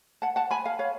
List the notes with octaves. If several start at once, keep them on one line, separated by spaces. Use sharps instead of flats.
F#5 A5
F#5 A5
G#5 B5
F5 G#5
C#5 F5